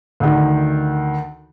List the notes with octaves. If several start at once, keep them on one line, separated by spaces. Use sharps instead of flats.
D2 D#3